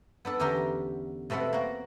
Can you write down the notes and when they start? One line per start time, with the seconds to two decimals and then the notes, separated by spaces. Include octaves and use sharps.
0.25 B3 D4 A4
0.39 E2 D3 C#4 G4 A#4 C6
1.30 B2 A3 C4 B4 F#5
1.53 A#3 F#4